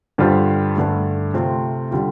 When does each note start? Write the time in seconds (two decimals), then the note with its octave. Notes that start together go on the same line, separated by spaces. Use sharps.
0.18 G2 D3 G3 F4 C5
0.76 G2 D3 A3
1.34 C3 A3 C4 F4
1.91 D3 G3 F4